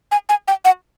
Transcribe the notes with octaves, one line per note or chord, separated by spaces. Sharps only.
G#5
G#5
G5
F#5